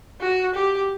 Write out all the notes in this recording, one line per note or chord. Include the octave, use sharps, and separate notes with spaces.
F#4
G4